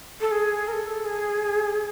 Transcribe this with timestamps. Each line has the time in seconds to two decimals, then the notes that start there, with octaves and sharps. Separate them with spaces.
0.21 A4
0.31 G#4
0.68 A#4
0.72 A4
1.05 G#4